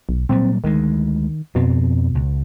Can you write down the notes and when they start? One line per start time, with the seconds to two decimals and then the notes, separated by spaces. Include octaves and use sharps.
0.09 B1
0.29 A#2 F#3 G3 C4
0.64 D2 D#3 G#3
1.55 F2 B2 B3 C4
2.15 C#2